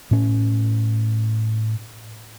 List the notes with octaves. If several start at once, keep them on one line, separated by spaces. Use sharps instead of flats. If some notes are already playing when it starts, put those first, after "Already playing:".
A2 C#4